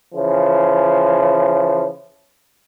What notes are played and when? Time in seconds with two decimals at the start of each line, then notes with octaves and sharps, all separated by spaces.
0.15 C#3 E3 F3